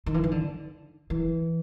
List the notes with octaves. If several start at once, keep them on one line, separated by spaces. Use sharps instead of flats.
D#3
E3
D#3
D3
E3